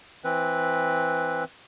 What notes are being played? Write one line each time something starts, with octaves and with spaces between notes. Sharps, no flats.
E3 C4 B4